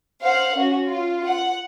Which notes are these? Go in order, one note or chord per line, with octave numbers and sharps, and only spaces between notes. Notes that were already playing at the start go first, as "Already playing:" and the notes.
C5 F5 F#5
C#4 F#4
F4
F#5